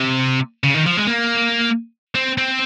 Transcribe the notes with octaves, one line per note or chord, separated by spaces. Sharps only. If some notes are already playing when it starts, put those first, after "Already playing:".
Already playing: C3
C#3
D#3
F3
G#3
A#3
C4
C4